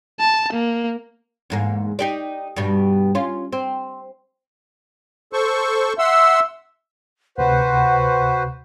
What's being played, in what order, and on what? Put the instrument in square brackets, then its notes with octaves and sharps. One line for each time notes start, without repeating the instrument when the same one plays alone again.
[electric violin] A5
A#3
[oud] E2 G#2 A#3
D#4 G4 D5
G2 B2 G3
C#4 F4
C4
[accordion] A4 C5 C#6
[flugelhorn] E5 [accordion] F#5 C6 E6
[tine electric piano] D2 C3 [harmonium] F#4 B4 C5 [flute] F#5